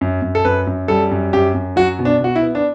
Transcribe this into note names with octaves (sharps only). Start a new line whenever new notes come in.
F#2
F#2
A4
F#2 B4
F#2
G3 A4
F#2
F#2 G4
F#2
F#3 F#4
B2
D4
B2 F#4
E4
B3
D4